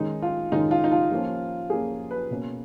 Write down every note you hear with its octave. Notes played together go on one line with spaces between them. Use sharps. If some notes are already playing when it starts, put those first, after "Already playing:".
Already playing: D#3 G#3 C#4 D#4
F4
D#3 G#3 C#4 D#4
F4
D#4
F4
F3 A#3 C#4
F3 A#3 C#4 G#4
B4
B2 A#3 C#4